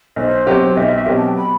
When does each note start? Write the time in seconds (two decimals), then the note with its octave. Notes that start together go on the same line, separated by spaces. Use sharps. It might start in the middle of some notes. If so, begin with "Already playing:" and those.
0.16 B1 C5
0.46 B2 F#3 C4 G4
0.76 B1 E5
1.06 B2 F#3 C4 G4 G5
1.16 A5
1.26 G5
1.36 B5